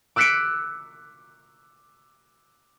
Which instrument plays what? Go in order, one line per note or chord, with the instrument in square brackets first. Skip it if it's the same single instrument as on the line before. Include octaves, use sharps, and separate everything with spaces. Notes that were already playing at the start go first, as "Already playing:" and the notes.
[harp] D6 E6 F#6 B6 C#7 D7